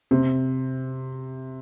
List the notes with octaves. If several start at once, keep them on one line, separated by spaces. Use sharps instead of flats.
C3